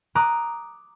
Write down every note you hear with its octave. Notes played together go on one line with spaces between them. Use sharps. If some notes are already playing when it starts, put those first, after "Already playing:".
A#5 D6 D#6 F#6